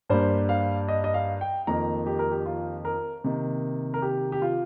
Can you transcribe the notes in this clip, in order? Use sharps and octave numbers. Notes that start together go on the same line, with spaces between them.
G2 G3 A#3 C5
F5
D#5
D#5
F5
G5
F2 D#3 A#3 A#5
G4
A#4
G4
F4
A#4
C3 D#3 A#3
A#4
G4
G4
F4